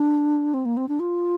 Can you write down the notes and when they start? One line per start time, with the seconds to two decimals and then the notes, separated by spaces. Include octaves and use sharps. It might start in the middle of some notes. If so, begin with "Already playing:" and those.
Already playing: D4
0.54 C4
0.65 A#3
0.77 C4
0.88 D4
1.00 F4